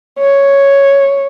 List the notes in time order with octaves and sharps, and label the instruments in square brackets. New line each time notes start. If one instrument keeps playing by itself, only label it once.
[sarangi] C#5